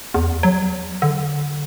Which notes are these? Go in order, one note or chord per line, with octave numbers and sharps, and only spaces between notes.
E2
F#3
D3